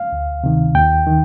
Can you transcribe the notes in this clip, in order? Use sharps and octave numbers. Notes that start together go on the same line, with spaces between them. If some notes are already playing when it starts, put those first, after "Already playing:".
Already playing: F5
D2
C3 D#3
D#2 G5
D#3